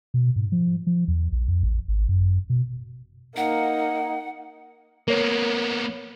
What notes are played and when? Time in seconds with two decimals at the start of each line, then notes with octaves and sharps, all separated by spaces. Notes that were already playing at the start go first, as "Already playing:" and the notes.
0.14 B2
0.36 G#2
0.52 F3
0.87 F3
1.08 E2
1.32 A#1
1.48 F2
1.63 A1
1.88 G#1
2.09 F#2
2.50 B2
3.37 A#3 D#4 F#5
5.08 A#3 B3 A#4 C#5